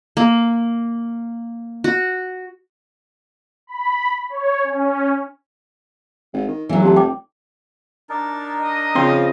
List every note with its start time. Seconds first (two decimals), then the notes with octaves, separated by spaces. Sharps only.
0.17 A#3
1.84 F#4
3.67 B5
4.30 C#5
4.64 C#4
6.33 G#1
6.48 D#3
6.69 E1 E3 F#3
6.82 F1 G4 A5
6.96 G5 D6
8.10 D4 D#4 A#4 A6
8.59 D#5
8.95 C#3 F3 C4 C6